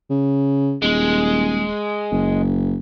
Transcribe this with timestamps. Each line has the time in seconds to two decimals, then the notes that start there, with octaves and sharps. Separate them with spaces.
0.10 C#3
0.83 D#1 G#3
2.12 F#1